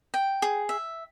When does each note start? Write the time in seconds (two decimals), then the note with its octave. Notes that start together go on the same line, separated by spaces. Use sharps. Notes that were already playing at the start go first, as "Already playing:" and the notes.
0.14 G5
0.42 G#4
0.69 E5